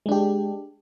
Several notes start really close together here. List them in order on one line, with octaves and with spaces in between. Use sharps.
G#3 D4 G4